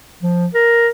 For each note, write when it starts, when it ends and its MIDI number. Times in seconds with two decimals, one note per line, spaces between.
0.23 0.47 53
0.54 0.89 70